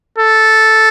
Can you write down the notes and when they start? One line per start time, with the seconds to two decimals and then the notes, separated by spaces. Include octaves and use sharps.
0.18 A4